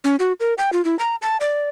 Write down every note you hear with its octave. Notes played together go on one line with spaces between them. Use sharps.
C#4
F#4
A#4
G5
F4
E4
A#5
A5
D5